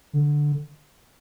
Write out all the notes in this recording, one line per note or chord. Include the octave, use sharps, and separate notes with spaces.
D3